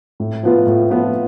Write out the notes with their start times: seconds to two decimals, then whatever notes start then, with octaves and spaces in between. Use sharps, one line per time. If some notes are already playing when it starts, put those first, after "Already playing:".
0.20 A2
0.43 F3 B3 F4 B4
0.67 A2
0.90 F3 B3 F4 B4